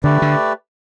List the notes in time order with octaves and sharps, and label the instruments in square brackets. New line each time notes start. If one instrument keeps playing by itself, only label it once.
[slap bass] D3 [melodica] A3 G4 B4 D5
[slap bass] D3